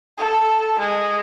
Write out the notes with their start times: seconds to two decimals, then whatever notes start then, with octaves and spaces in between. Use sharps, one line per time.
0.18 A4
0.79 G#3